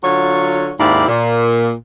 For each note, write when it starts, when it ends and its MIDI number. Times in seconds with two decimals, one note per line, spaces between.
0.04 0.72 50
0.04 0.72 54
0.04 0.72 65
0.04 0.72 73
0.79 1.05 39
0.79 1.05 44
0.79 1.05 60
0.79 1.05 64
0.79 1.05 74
0.79 1.05 77
1.08 1.72 46